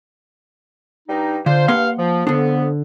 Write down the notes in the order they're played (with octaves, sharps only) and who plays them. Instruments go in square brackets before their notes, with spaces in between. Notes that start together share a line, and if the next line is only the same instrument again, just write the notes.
[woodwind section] G2 G3 D#4
[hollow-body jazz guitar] D3 [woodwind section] D4 F4 C5
[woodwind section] G2 F5 [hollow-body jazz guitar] A#3 F#5 C6
[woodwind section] F3
[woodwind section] F2 B3 [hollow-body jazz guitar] D3 D4